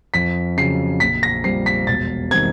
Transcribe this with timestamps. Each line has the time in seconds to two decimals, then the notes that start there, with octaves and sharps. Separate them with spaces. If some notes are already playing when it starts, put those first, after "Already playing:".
0.14 F2 B6
0.57 C#3 F#3 C7
1.00 A#1 B6
1.23 A#6
1.44 A#2 G3 C4 C7
1.66 B6
1.87 E1 A6
2.31 D#3 G3 C4 G#6